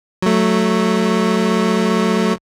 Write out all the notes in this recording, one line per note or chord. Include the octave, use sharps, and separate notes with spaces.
F#3 A3